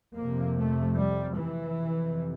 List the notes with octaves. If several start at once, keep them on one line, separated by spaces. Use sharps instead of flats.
F2 C3 A#3
A3
G3
E3
F2 C3